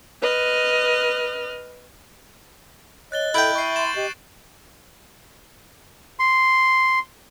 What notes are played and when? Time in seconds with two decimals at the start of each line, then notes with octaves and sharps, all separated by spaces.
0.21 B4 D#5 F6
3.12 C#5 D#5 F#6 A6 G7
3.34 E4 A4 G5 G6 D7 F#7
3.55 E5 C#6 C7
3.76 C6 A6 E7
3.96 G4 D#5
6.19 C6